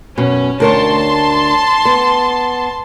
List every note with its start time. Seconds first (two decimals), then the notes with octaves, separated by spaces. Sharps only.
0.18 F#2 B2 C#4
0.60 D2 A#4 C#5 A5 C6
1.85 B3